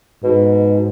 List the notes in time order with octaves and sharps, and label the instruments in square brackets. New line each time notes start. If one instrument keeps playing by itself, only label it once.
[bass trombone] G#2 [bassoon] B2